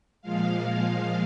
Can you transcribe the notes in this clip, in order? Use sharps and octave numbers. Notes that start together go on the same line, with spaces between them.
A#2 F3 G#3 F5